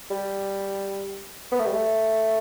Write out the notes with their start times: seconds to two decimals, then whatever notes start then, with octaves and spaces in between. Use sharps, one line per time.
0.10 G3
1.52 B3
1.59 A3
1.66 G3
1.73 A3